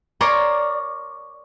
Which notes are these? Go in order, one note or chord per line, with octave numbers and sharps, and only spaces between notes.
A#4 C#5 D5 A#5 C6